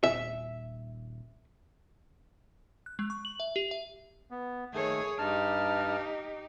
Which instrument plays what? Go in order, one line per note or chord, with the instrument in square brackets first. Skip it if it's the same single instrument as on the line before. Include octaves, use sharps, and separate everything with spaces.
[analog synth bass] D#1 [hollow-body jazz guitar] E5
[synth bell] F#6
G#3
C#6
F#7
E5
G4
E5
[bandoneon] B3
[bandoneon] D#3 A3 [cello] G#4 C#5
[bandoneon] G2 A5 F6 [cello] D#4 G4